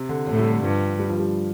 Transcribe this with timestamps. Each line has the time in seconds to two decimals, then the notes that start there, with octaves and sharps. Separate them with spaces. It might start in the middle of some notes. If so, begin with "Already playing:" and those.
Already playing: C3
0.09 D3
0.27 A2 D3
0.34 A3
0.39 G3
0.51 D3
0.63 G2 F3
0.99 G3
1.09 F3
1.19 G3